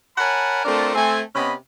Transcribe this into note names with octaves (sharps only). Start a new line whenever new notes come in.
A#4 C#5 F#5 G#5 A5 B5
A3 C4 D4 F4 A4 A#4
A3 C4 G#5
C3 B3 C#4 D#5 B5